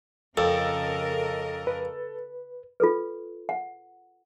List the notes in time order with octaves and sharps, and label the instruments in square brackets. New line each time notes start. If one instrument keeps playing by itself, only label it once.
[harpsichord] F2 [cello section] C#3 A#4 D#5 [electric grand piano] A4
[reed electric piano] B4
[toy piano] F4 A4 B4
F#5